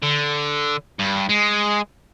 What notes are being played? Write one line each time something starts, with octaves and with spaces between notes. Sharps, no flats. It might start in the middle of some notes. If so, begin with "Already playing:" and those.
D3
G2
G#3